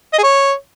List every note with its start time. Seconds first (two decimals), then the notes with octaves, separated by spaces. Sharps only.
0.13 D#5
0.18 G#4
0.23 C#5